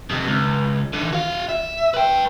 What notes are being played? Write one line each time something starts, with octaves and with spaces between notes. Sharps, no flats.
F2 C3
C#2
D3 E3
F#4 F5
E5
B4 G5